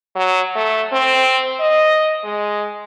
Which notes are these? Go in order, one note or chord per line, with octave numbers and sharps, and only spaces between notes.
F#3
A3
C4
D#5
G#3